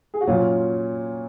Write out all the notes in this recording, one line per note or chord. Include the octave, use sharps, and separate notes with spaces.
G#4
F#4
A#2 F#3 C#4 F4